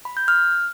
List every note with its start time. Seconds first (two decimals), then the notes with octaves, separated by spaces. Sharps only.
0.05 B5
0.17 G6
0.28 F6